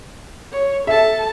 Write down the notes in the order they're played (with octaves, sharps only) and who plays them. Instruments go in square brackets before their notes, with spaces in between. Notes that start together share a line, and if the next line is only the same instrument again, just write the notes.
[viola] C#5
[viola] A4 A5 [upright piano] E5